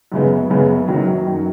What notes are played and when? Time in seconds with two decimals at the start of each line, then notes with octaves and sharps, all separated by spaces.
0.12 F#2 C#3 G#3 B3
0.50 F#2 C#3 G#3 B3
0.88 F#1 F#2 D#3 F#3
1.26 F#2 D#3 F#3